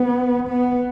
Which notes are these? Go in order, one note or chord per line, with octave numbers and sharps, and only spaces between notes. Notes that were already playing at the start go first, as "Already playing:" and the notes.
Already playing: B3
B3